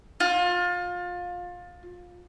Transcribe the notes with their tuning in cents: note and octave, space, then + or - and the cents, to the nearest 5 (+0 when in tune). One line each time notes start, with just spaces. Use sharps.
F4 +25